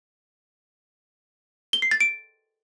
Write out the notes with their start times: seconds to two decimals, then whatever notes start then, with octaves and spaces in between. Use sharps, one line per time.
1.73 G7
1.82 C7
1.91 A6
2.01 D7